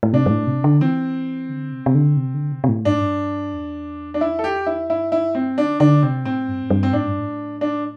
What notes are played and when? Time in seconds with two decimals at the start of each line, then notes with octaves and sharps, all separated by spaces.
0.03 A2
0.13 C3 D4
0.26 G2
0.30 A2
0.47 C3
0.64 D3
0.81 E3 C4
1.49 D3
1.72 C3
1.86 C3
1.95 D3
2.17 C3
2.34 D3
2.52 C3
2.64 C3
2.69 A2
2.85 G2 D4
2.93 A2
3.00 G2
3.53 E2
4.14 D4
4.21 E4
4.39 A4
4.44 G4
4.66 E4
4.89 G2 E4
5.12 E4
5.35 C4
5.57 D3 D4
5.80 D3 D4
6.02 C3 C4
6.25 A2 C4
6.48 G2
6.63 A2
6.70 G2
6.83 C4
6.93 A2 D4
7.07 G2
7.19 A2
7.61 D4